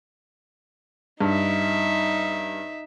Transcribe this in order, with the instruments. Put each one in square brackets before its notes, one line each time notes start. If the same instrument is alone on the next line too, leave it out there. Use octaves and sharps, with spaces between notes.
[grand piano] G2 [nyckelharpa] D#4 E5